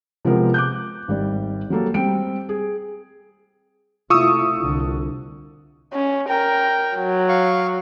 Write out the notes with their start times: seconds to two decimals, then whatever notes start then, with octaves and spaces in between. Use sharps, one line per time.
0.25 C3 F3 G#3 B3 A#4
0.54 D6 F#6 G6
1.08 G#1 G3 D5
1.70 F#3 G3 A#3 A4
1.94 G3 C4 G5 D7
2.49 G#4
4.10 C3 A3 E4 F4 C#6 D#6 E6
4.59 C2 D3
5.93 C#4
6.29 A#4 G5
6.96 F#3
7.29 F5 C#6